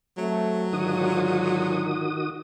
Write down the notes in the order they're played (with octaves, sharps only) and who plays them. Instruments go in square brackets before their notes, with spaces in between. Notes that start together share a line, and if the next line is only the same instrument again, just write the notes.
[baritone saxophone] F#3 [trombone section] A3 C4
[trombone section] G#2 D3 F4 [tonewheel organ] D#3 F#4 D#6